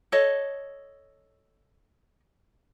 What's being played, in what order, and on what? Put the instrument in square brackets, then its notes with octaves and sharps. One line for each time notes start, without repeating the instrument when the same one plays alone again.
[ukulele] A4 C#5 D#5